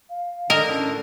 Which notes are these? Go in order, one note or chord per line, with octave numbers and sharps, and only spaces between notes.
F5
D3 A#4 D#5
A2 C#4